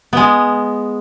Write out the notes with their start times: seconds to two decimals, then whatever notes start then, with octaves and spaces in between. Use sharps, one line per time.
0.13 G#3 B3